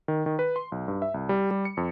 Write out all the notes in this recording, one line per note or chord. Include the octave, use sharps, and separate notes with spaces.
D#3
D#3
B4
C6
B1
G2
E5
C2
G3
G3
C#7
F2